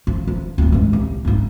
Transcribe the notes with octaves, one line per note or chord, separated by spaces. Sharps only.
F3
F3
D1 C4
G2 G#3
C2
G#1 D#4